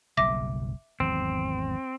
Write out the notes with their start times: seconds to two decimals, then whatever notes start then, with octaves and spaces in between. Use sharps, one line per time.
0.17 F#1 B1 G3 E5 D6 A#6
1.00 G#1 E2 F#3 C4